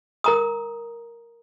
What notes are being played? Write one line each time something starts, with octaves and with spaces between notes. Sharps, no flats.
A#4 A#5 D#6